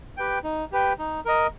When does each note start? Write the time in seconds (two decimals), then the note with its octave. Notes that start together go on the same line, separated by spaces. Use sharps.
0.17 G4 B4 G5
0.44 D#4
0.72 G4 B4 G5
0.99 D#4
1.25 A#4 D#5